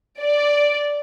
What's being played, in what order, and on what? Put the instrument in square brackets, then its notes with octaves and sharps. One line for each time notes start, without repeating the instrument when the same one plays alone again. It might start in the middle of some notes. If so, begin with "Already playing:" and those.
[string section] D5